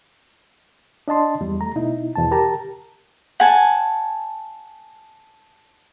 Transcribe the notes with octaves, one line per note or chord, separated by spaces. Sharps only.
D4 D#5 A5 C6
E2 G3
A3 A#5
B2 D#4 E4
E2 B2 A5
G4 A#4 A5 A#5
F#5 G#5 A5